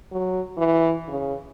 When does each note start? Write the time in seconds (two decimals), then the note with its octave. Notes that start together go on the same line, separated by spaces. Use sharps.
0.12 F#3
0.57 E3
1.08 C#3